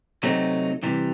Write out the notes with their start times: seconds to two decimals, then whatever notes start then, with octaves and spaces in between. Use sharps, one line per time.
0.23 C3 F#3 A3 C4 D#4
0.83 C3 E3 G3